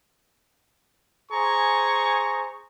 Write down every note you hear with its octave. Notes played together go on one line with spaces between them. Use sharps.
G#4 C5 G#5 A#5 C#6